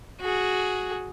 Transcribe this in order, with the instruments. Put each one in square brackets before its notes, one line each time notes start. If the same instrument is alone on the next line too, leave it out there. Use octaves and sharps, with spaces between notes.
[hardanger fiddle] F#4 G#4